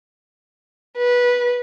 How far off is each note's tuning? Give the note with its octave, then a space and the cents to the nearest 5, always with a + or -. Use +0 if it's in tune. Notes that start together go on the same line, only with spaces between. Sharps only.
B4 -15